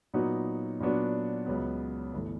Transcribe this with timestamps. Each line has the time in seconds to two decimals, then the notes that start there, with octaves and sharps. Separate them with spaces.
0.14 A#2 F#3 B3 D#4 F#4
0.80 A#2 F#3 B3 D4 F#4
1.46 C#2 C#3 F#3 B3
2.14 G1 G2 E3 A3